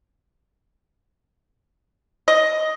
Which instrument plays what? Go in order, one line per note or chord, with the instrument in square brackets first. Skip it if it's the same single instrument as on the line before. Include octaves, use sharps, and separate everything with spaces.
[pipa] D#5